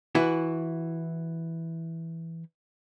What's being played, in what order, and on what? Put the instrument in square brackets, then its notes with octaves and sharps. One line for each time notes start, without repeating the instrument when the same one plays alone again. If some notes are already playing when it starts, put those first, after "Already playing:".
[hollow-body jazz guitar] E3 E4 F#4